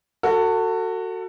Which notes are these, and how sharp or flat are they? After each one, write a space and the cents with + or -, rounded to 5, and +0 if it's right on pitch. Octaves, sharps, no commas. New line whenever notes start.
F#4 +0 A4 +30